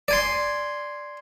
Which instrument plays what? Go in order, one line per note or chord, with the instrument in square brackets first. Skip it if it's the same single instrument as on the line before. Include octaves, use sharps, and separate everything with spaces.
[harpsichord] D5 G#5 C6